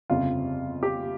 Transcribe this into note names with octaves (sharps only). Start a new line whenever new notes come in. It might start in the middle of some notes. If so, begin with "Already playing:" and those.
G1 F2 C#3 F3 F4
G4